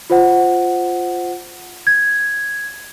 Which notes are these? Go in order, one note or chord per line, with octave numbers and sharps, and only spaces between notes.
F4 C5 F#5
G#6